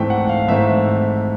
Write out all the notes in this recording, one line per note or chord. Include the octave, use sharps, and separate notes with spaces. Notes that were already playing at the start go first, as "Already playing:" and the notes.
Already playing: G#2 E3 A3 C4 G5
F#5
F5
G#2 E3 A3 C4 E5